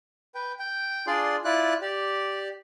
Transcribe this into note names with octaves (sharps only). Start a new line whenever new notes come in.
B4 G5
G5
D4 F4 G#4 D5 C6
E4 F4 D5 F#6
G4 D5